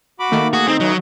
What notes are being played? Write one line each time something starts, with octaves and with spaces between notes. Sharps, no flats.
F#4 B5 D6
D#3 A3 A#3
F#4 G#4
C4 D#4
C#3 E3 F#3 G#3